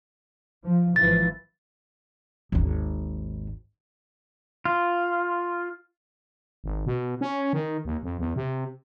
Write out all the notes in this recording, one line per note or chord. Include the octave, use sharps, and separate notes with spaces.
F3
G#1 E3 F3 A6
G#1 D#2
F4
G#1
B2
C#4
D#3
D#2
F2
E2
C3